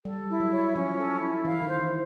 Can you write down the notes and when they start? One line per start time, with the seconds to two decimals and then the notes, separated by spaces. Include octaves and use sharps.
0.05 G3 A4
0.30 E4
0.40 F#3
0.52 C#5
0.75 F3 C#4
0.98 A4
1.21 E4
1.45 E3 F5
1.62 D#3
1.68 C5
1.80 E3